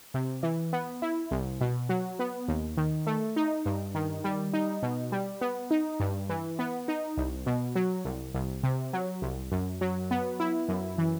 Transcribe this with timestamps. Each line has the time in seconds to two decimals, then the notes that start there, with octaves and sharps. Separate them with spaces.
0.14 C3
0.43 E3
0.73 B3
1.02 E4
1.31 C2
1.61 B2
1.89 F#3
2.19 B3
2.48 D#2
2.77 D#3
3.07 A3
3.36 D#4
3.66 G2
3.95 D#3
4.24 G3
4.53 D#4
4.83 B2
5.12 G3
5.41 B3
5.71 D#4
6.00 G2
6.29 E3
6.59 B3
6.88 D#4
7.17 C2
7.46 B2
7.75 F#3
8.05 C2
8.34 C2
8.63 C3
8.93 F#3
9.22 C2
9.51 F#2
9.81 F#3
10.11 B3
10.40 E4
10.69 F#2
10.98 E3